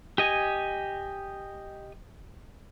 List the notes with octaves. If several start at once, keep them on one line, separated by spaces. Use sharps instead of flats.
G4 D#5 G#5